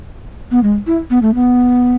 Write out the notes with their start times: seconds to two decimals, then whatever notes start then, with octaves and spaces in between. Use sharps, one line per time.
0.51 B3
0.63 G#3
0.87 E4
1.10 B3
1.22 A3
1.35 B3